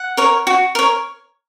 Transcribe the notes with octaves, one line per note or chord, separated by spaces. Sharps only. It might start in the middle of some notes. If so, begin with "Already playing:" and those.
Already playing: F#5
A#4 C#5
F#4
A#4 C#5